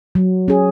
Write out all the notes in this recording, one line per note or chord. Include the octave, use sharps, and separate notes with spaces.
F#3
C#4 G#4